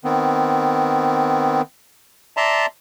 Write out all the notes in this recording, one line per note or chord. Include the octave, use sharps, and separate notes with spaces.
D#3 B3 C4
D5 E5 A5 A#5 C6